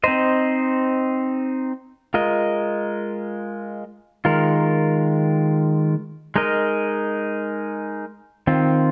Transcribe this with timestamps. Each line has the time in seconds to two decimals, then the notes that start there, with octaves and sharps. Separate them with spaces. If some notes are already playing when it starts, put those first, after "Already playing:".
0.04 C4 D#4 C5 D#5
2.14 G#3 F4 A#4 D#5
4.25 D#3 G#3 F4 A#4
6.36 G#3 D#4 A#4 D#5
8.47 D#3 C4 F4